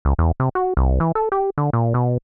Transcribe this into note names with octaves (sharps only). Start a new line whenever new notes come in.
C#2
E2
C3
F#4
C2
E3
A4
G4
D3
A#2
B2